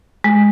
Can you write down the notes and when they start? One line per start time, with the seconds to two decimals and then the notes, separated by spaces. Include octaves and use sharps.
0.24 G#3